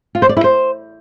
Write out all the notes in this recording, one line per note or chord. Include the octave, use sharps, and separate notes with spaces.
F4
C5
D5
E4
C5